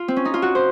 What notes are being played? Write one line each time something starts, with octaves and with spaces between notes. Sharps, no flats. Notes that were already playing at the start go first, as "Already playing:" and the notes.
Already playing: F4
C4
C#4
D#4
F4
F#4
C5